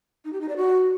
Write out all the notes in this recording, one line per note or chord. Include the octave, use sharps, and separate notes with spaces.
D#4
G4
D#4
D5
F#4